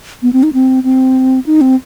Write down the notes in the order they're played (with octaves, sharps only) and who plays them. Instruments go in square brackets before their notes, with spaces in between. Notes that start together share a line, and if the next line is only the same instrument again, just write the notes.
[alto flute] B3
C4
D#4
C4
C4
D#4
C4